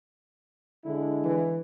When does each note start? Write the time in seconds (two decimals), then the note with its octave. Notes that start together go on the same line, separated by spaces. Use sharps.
0.85 D3 G#3 E4
1.25 E3